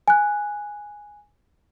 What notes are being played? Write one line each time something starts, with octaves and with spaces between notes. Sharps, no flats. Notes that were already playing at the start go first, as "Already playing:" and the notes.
G#5 F#6